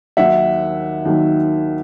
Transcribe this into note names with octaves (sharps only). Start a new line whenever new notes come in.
D#2 D#3 F#3 E5 F#5
D#2 D#3 F#3